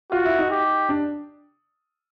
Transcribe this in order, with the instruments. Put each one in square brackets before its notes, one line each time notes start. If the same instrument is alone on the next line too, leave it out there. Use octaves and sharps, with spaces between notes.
[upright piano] F4 [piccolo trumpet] F#4
[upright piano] E4
D#4
[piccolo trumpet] G4
[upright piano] D4